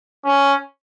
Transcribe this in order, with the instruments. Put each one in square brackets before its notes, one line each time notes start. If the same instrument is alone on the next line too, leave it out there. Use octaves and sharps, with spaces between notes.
[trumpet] C#4